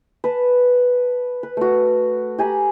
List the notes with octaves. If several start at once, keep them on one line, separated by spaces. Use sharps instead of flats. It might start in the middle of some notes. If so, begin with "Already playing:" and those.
B4 A5
B4
A3 F#4
G4 G#5 A#5 B5